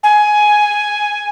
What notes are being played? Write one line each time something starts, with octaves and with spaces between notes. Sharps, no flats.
G#5